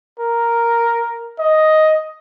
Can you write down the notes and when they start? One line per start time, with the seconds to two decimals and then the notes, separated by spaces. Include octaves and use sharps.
0.19 A#4
1.39 D#5